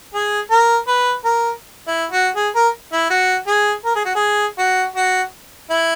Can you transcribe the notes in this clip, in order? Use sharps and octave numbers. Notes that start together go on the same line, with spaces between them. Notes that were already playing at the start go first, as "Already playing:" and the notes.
G#4
A#4
B4
A#4
E4
F#4
G#4
A#4
E4
F#4
G#4
A#4
G#4
F#4
G#4
F#4
F#4
E4